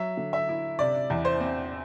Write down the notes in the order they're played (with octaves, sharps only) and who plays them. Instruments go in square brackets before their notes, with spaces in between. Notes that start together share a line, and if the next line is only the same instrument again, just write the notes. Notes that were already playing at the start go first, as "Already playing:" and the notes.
Already playing: [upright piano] F#3 [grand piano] E5
[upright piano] D3
[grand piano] E5
[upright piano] E4
[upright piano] C3 [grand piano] D5
[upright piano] E2
[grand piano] C5
[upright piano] C4